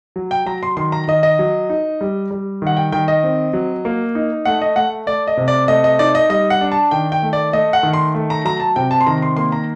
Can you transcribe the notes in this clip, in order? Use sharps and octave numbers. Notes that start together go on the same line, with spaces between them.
F#3
G5
F#3 A#5
C6
D#3 C6
A#5
D#3 D#5
D#5
F#3
D#4
G3
G3
D#3 F#5
G5
D#3 G5
D#5
C4
F#3
A#3
D#4
A3 F#5
D#5
A3 F#5
A3 D5
D#5
C3
D5
A3 D#5
D#5
D#4 D5
D#5
G3 D#5
F#5
D4
A5
D#3 G5
G5
A3
D5
A3 D#5
F#5
D#3
C6
A3
A#5
F#3 A#5
A5
C3 G5
A5
C6
D#3 A#5
C6
A#3 C6
A#5